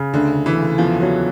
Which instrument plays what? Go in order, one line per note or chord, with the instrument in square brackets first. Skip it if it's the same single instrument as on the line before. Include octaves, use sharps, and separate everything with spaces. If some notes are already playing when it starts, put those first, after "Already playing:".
Already playing: [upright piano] C#3
[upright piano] D2 [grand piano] D3
[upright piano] D2
[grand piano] E3
[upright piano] C#3
[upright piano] E2 [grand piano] F3
[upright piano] E2 [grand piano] F#3